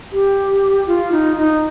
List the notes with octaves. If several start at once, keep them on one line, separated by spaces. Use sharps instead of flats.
G4
F4
D#4
D#4